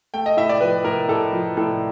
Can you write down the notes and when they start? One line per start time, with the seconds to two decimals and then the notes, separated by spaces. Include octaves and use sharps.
0.14 A3 G5
0.26 D#5
0.37 A2 E5
0.49 D5
0.61 F3 B4
0.84 A2 A#4
1.08 A2 A4
1.32 F3
1.57 A2 A4